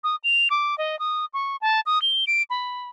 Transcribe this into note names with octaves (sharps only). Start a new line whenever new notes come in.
D#6
F7
D6
D#5
D#6
C#6
A5
D#6
G7
D7
B5